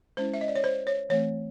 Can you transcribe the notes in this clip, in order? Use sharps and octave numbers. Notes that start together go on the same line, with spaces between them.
G#3 C#4 E4 C5
E5
D#5
D5
C#5
C5
C#5
E3 A3 C4 C#5